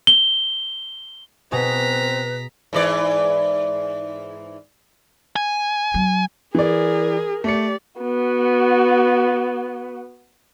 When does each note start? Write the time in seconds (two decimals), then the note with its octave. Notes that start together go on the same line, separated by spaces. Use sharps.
0.07 G7
1.52 B2 C4 G#4 B4 A#5 B6
2.73 G#2 E3 D5
5.36 G#5
5.94 F#3
6.55 E3 G#4 A#4 D5
7.44 A3 G4 D5 C#7
8.01 B3 F#4